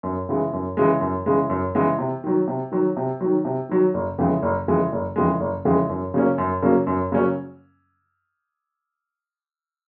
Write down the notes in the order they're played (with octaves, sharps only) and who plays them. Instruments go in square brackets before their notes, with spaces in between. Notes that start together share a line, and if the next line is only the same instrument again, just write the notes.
[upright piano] F#2
C#3 E3 G#3
F#2
C#3 E3 G#3
F#2
C#3 E3 G#3
F#2
C#3 E3 G#3
C3
D#3 F#3
C3
D#3 F#3
C3
D#3 F#3
C3
D#3 F#3
F#1
F2 C#3 E3 G#3
F#1
F2 C#3 E3 G#3
F#1
F2 C#3 E3 G#3
F#1
F2 C#3 E3 G#3
F#2
C#3 F#3 A#3 C#4
F#2
C#3 F#3 A#3 C#4
F#2
C#3 F#3 A#3 C#4